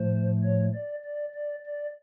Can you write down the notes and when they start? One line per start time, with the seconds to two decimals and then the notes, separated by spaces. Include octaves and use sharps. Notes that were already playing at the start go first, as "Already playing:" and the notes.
Already playing: A2 F3 A3 C5
0.44 C#5
0.74 D5
1.05 D5
1.35 D5
1.66 D5